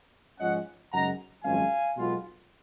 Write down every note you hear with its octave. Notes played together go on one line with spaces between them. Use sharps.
G#2 F3 G#3 C#4 F4 D#5 F#5
F#2 C#3 G#3 D#4 F#5 A#5
G#1 F#2 F3 G#3 C#4 F5 G#5
B1 B2 G#3 B3 F4